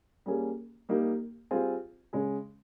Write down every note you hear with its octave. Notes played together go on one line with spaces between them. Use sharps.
G3 A#3 C#4 G#4
G3 A#3 D#4 G4
G3 C4 F4 G#4
C#3 G#3 C#4 G#4